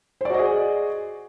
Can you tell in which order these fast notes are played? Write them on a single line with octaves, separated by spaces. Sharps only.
C5 D5 F#4 D#5 G#4